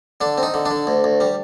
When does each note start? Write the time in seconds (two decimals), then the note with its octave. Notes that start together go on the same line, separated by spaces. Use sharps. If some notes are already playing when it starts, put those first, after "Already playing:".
0.21 D3 D4
0.38 C4
0.43 D#4
0.54 D3
0.66 D4
0.71 D3
0.87 D2
1.04 D2
1.21 G3